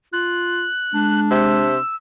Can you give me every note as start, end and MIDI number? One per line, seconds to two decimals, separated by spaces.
0.13 0.66 65
0.13 1.21 90
0.94 1.70 56
0.94 1.78 62
1.30 1.77 48
1.30 1.96 88